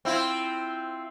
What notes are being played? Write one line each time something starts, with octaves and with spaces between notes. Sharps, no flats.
C4 E4 F4